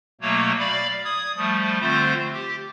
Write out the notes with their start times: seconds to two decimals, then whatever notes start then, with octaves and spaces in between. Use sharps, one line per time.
0.21 B2 F#3 A3 A#3 C#5
0.59 D5 F5 B5
1.05 D#6 G#6
1.37 F3 G3 A3
1.81 D3 A3 C4 F4 C5
2.33 G4